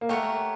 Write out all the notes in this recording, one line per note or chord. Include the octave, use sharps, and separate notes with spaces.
A#3
A3 G4 A#4 C#5 F#5